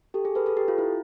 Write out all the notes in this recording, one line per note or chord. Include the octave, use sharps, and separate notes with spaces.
G4 A4
G#4
A4 B4
A4 B4
G4 A4
F4
E4